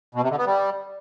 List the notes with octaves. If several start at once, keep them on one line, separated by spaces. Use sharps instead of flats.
B2
C3
D3
B3
G3